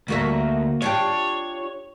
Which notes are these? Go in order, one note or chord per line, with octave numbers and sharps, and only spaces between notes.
D2 A#3 F#4 E5
D4 F4 G4 C#5